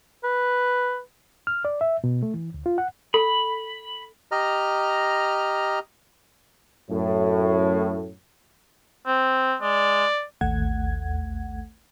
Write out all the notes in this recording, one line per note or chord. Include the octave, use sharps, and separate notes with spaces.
B4
F6
D5
E5
B2
A3
E3
D2
F4
F#5
A4 B5
G4 D#5 A#5 F6
F#2 A2
C4
G#3 D5
A1 D#2 A3 F#5 G#6